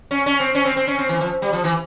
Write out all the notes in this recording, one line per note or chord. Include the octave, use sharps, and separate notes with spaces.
C#4
C#4
C4
C#4
C4
C4
C#4
C4
E3
F3
G3
F3
E3